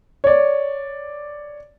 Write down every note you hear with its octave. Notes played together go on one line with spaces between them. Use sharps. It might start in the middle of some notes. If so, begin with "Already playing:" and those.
C#5 D5